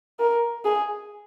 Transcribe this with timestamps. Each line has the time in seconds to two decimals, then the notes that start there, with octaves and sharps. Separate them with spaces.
0.19 A#4
0.65 G#4